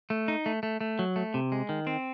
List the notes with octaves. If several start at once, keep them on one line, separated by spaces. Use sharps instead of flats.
A3
D#4
A3
A3
A3
F#3
A3
C3
G#3
D#3
C4